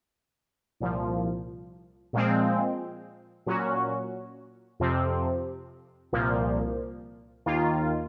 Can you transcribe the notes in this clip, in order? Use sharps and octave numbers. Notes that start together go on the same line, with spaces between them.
C2 A#2 F3
A#2 F3 G#3 C4
A#2 F#3 C#4 F#4
F2 C3 F3 C4
C2 A#2 F3 A#3
D#2 D#3 A#3 F4